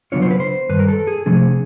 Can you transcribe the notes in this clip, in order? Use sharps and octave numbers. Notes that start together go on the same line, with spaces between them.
C#3 F#3 B3 D4 F4 C#5
C5
B4
C5
G2 D#3 B4
A#4
A4
G#4
C3 F3 A3 D4 G#4